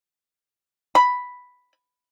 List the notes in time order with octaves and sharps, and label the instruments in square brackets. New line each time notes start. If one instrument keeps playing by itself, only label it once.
[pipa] B5